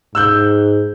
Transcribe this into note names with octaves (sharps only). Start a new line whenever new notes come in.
G#2 E6 F#6 G6